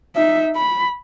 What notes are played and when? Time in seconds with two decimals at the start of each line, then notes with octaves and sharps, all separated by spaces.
0.15 D#4 E5
0.56 B5